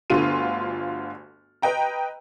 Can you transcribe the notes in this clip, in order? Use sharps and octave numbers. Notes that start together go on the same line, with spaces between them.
G1 D2 D3 F4 D#7
B4 D#5 G5 A#5